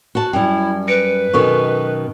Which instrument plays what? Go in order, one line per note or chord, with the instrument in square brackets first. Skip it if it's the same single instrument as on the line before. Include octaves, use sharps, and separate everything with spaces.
[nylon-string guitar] F#4 A5
[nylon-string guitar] F#2 G3 [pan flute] E4 [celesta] G5
[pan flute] B4 [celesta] A#6 C#7 D7
[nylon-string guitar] F#2 B2 D#3 [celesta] A4 C#6